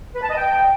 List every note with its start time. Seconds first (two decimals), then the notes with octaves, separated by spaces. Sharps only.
0.15 B4
0.22 A5
0.29 D#5
0.36 G5